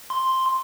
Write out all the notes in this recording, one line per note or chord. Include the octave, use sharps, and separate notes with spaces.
C6